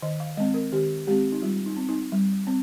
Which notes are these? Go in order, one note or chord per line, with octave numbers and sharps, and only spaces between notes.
D#3 D#5
F5
G#3 C4 D#5
A#4
D#3 G4
G#3 C4 G4
D#4
G3 F4
D#4
C4
D#4
G3
C4